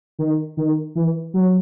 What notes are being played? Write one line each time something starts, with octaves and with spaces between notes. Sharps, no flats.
D#3
D#3
E3
F#3